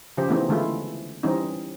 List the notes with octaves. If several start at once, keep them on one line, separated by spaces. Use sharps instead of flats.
C#3 F3 G4 C5
E3 A3 B3 C4 D#4
D3 E3 G#3 A3 E4 F4
E3 G3 C4 C#4 D#4